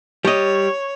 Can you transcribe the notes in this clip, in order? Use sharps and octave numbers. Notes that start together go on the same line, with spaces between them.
G3 C#5 D#5